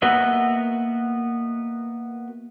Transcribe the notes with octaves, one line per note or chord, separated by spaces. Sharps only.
A#3 B3 F#4 D#5 E5